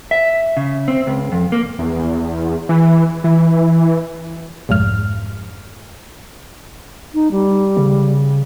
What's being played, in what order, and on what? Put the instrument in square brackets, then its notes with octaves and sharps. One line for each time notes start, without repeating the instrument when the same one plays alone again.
[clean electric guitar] E5
C#3
C4
C#2
F2
A#3
[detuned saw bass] E2
E3
E3
[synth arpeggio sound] B1 F2 G#2 F6
[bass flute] D#4
G3
[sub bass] C#3